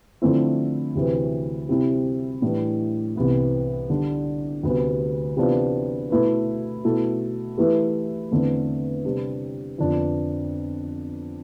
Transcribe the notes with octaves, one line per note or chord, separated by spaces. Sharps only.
D3 F3 A3 C4 E4
D2 C3 E3
C3 G3 C4 E4
A2 E3 G3 D4
C2 C3 E3 B3 E4
D3 G3 D4
D2 C3 G3 B3
C3 E3 B3 D4 F4
B2 A3 E4 B4
B2 A3 E4 A4
E3 A3 E4 G4 B4
E2 D3 A3 C4
C3 G3 D4
F2 D3 F3 B3 D4